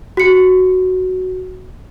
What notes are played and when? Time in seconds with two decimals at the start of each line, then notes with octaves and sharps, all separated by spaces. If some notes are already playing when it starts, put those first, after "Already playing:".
0.17 F#4 C#7